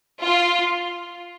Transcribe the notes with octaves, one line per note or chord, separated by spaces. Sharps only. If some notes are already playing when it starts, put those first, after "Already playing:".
F4